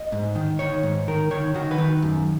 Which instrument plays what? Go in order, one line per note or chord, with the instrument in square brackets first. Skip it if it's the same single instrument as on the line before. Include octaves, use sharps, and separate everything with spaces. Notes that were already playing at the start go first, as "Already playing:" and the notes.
Already playing: [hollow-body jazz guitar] D#5
G#2
D#3
D#3 C#5
G#2
D#3 A#4
D#3 C#5
D#3 F#4
B4
D#3
F#2